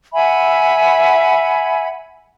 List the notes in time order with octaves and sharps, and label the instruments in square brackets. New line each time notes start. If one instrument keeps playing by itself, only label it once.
[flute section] E5 F#5 G#5 B5